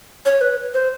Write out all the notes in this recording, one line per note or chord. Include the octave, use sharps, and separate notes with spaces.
C#5
B4
C5